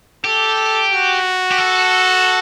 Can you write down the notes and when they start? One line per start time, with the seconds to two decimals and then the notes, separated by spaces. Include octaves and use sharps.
0.25 G4 A4
0.92 F#4
1.52 G4
1.59 A4